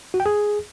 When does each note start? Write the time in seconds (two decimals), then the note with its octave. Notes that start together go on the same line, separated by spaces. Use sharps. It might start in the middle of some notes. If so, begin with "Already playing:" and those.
0.14 F#4
0.20 G5
0.26 G#4